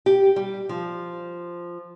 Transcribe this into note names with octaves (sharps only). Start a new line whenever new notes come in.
G4
G3
F3